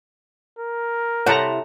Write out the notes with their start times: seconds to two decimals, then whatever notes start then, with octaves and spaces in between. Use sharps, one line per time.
0.59 A#4
1.26 C3 E4 A4 C5 C#5 F#5 A5 A#5